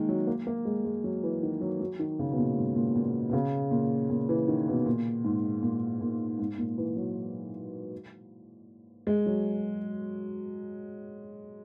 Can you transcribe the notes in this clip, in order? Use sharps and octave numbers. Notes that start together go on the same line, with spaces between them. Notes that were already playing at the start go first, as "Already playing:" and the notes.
Already playing: D#3 G#3 A#3
F#3
A#3
A#3
G#3
G#3
F#3
E3
D#3
F#3
F#3
D#3
C#3
B2
A#2
G#2
A#2
A#2
B2
C#3
A#2
A#2
E3
D#3
B2
A#2
G#2
A#2
A#2
G#2
A#2
E3
F#3
G#3
F#3